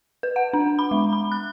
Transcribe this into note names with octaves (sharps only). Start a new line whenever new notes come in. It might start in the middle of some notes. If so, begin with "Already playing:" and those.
B4
F#5
D4
B5
G#3
B5
F#6